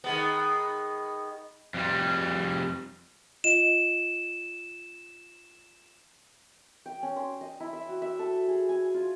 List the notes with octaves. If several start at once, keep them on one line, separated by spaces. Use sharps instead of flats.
D#3 G#3 B3
F2 G3
F4 D#5 E7
G5
C#4
C6
D#5
E4
E5
F#4
E5
A4
G#4
G#5
F4